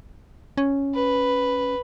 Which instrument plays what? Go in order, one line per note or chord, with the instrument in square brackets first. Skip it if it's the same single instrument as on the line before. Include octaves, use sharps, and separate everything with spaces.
[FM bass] C#4
[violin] B4